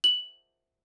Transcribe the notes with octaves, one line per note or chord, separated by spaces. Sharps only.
F#7